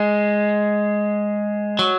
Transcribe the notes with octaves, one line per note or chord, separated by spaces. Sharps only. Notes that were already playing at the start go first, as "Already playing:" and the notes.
Already playing: G#3
F#3